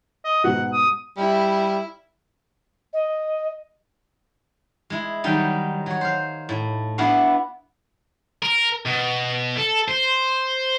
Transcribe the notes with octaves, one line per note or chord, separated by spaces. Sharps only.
D#5
G#2 B2 F#5
D#6
G3 E4
D#5
G#3 E4
D#3 F#3 G3 D#4
F#3 C#5
C5 F5
A2
B3 D4 E4 F#4 F5
A#4
B2
A4
C5